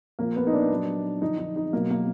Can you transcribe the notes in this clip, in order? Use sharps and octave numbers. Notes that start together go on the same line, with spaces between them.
A#2 F3 A#3
B3
D#4
D4
A#2 F#3
D3 F3 D#4
D#4
D#4
B2 F#3 A#3
A#3